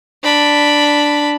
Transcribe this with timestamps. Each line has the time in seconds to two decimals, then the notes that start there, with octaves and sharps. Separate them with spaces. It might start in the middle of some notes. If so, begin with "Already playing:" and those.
0.23 D4 B5